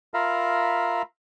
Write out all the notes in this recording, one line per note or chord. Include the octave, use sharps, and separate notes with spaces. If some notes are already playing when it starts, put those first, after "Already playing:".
F4 A#4 E5 F5 A#5 B5